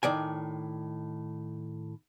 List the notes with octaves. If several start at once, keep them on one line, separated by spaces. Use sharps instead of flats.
A2 D#3 D5 G#5